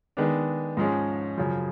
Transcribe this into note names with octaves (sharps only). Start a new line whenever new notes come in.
D#3 G#3 B3 D4
G#2 F3 G#3 C#4
F#2 C#3 F3